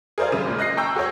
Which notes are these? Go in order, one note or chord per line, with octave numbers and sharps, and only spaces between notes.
G#4 A#4 C5 D5 F5
F#2 C#3 E5
G#1 A#2
D#5 F#6 A#6 C7
G5 A5 A#5 C#6 E6 G6
F#4 G#4 A4 C#5